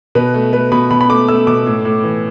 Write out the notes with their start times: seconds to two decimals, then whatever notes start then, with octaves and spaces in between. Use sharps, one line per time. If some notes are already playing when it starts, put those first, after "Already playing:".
0.15 B2 B4
0.34 A3
0.53 A3 B4
0.72 B2 B5
0.91 B2 B5
1.01 B5
1.09 A3 D6
1.28 A3 E6
1.47 B2 D6
1.66 A2
1.85 A2
2.04 E3